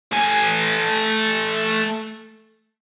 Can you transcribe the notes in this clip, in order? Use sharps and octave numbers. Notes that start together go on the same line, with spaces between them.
A3 G#5